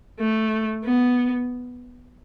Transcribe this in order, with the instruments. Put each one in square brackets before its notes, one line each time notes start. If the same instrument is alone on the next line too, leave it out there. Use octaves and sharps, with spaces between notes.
[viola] A3
B3